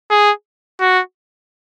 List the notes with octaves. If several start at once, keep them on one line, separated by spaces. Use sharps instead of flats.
G#4
F#4